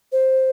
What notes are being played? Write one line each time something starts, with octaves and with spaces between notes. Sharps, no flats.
C5